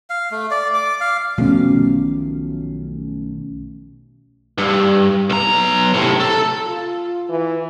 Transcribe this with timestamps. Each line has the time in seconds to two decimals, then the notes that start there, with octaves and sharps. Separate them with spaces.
0.10 F5
0.31 A3
0.51 D5
0.74 D6
1.01 F5
1.38 B1 B2 D#3 F3 A3 C#4
4.58 G2
5.30 B1 A#5
5.94 A2 C3
6.20 A4
6.66 F4
7.29 E3